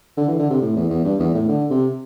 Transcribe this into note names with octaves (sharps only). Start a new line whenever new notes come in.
D3
E3
D3
C3
A2
E2
E2
G2
E2
A2
D3
C3